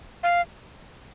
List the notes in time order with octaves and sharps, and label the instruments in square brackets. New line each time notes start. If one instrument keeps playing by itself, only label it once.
[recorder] F5